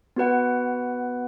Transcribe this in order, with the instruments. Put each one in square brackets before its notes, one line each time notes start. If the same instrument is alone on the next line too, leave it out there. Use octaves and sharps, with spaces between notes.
[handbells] B3 F#4 B4 F#5